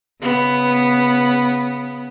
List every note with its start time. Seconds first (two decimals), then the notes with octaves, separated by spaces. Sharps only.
0.22 C#3 B3